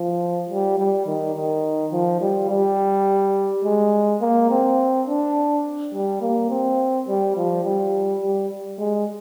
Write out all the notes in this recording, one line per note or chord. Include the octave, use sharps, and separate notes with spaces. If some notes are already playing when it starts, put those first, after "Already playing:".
Already playing: F3
G3
G3
D#3
D#3
F3
G3
G3
G#3
A#3
C4
D4
G3
A#3
C4
G3
F3
G3
G3
G#3